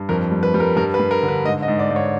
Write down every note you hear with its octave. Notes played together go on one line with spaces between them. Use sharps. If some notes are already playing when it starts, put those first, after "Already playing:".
Already playing: G2
F2 A#4
G3
B4
G3
A#4
G2 A#4
B4
G2
A#4
D3
B4
G#2 D#5
D#5
G#2
D5
G#2
C#5